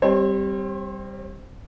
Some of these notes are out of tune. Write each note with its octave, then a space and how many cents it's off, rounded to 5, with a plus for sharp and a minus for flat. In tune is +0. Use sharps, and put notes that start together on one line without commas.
G3 +0 C4 +0 C#5 -45